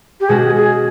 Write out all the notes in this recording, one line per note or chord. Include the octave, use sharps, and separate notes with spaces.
G4
B2 G#3 C#4 F#4 G#4
G#4